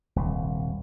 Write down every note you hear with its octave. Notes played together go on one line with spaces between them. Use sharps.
D#1 C2